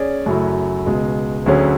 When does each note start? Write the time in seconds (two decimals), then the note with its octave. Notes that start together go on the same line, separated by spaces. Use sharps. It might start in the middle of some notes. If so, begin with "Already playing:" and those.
Already playing: C#4 G#4 D5
0.26 F#2 C#3 F#3 A3 E4
0.86 C#2 B2 G#3
1.46 D2 D3 F#3 C#4 G#4